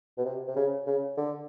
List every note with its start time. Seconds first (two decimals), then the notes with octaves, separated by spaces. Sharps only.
0.18 B2
0.25 C3
0.48 C3
0.56 C#3
0.87 C#3
1.17 D3